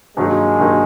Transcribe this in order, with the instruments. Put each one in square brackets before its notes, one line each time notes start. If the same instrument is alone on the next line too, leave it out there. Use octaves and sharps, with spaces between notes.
[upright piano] G2 D#3 F#3 A#3 D#4 [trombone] G#3
[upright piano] G2 D#3 F#3 A#3 D#4